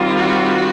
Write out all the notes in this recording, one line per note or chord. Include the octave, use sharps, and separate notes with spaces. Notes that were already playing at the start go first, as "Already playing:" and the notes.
Already playing: D#3 G3 C4 F4
F#4